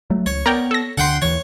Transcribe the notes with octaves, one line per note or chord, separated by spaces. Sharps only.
F#3 A3
C#2 C#5
B3 A#4 D5 G5
A4 A#6
D2 D3 F#5 G5 C6
D#2 E3 C#5